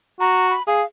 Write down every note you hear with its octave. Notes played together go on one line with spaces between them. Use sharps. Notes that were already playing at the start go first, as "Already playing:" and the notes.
F#4 A#5
B5
G#4 F5